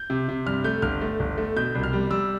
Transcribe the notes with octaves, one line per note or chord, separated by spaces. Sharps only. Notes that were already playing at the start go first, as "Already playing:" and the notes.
Already playing: G6
C3
C3
G2 F6
A3 G6
G1 F6
A3
G1
A3
B2 G6
C2
F6
G3
G3 E6